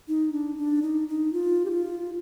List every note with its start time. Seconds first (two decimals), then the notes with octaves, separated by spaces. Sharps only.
0.08 D#4
0.32 D4
0.58 D4
0.82 D#4
1.08 D#4
1.33 F4
1.65 G4
1.71 F4